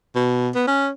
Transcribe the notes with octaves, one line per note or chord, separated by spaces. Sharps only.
B2
B3
C#4